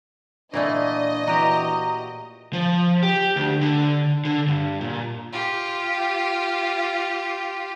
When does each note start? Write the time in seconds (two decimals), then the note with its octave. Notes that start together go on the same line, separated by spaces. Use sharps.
0.54 A#2 E3 A3 D4 D#5
1.27 E3 F#4 G4 A#5
2.53 F3
3.03 G4
3.36 D2
3.61 D3
4.25 D3
4.48 G2
4.81 A#2
5.32 F4 G4